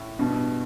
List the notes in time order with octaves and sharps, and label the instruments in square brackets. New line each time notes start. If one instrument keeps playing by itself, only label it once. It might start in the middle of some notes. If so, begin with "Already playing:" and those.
Already playing: [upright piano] A2
[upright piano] G2 [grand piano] B2